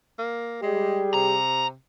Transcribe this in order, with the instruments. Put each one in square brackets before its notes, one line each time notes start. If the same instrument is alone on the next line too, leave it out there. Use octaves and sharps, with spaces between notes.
[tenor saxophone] A#3
[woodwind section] G3 G#4 [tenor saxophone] G#3 [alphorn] G4
[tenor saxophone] C3 [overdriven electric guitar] A#5